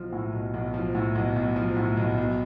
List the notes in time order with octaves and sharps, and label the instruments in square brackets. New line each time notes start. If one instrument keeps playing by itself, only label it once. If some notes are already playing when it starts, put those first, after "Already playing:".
Already playing: [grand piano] B1 F3
A2
B1
B1
F3
A2
B1
B1
F3
A2
B1
B1